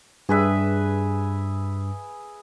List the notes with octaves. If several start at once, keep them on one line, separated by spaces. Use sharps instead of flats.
G2 G#4 B4 E5